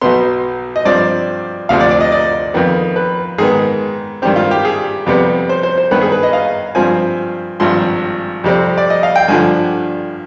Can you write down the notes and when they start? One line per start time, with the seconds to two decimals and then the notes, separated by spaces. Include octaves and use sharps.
0.01 B1 B2 B3 C6
0.76 D#5
0.85 G2 F3 C4 D5
1.69 D2 C3 F3 F5
1.80 D5
1.91 D5
2.01 D#5
2.12 D5
2.54 F2 D#3 B3
2.96 B4
3.38 G#2 D#3 B3 G#4
4.22 G2 D#3 G3 C4 G4
4.36 F4
4.51 G4
4.65 G#4
5.06 F2 C3 G3 B3
5.49 C5
5.63 C5
5.78 C5
5.91 G2 D#3 B3 B4
6.02 G#4
6.12 B4
6.23 D#5
6.33 F5
6.75 G2 F3 C4 G#5
7.60 G#1 G2 F3 C6
8.44 F2 C3 G3 C4
8.78 D5
8.90 D#5
9.03 F5
9.16 G5
9.28 G2 D3 F3 G#5